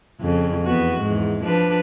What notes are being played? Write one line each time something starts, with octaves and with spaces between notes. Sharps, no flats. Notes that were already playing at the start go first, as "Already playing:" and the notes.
F2 C#3
E2 B3 F#4
E2 G#2
F3 D4 B4